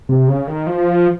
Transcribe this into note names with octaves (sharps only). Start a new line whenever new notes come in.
C3
C#3
D#3
F3